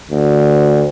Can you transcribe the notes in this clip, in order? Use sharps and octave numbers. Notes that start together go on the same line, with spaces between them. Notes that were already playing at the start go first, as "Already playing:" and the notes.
D2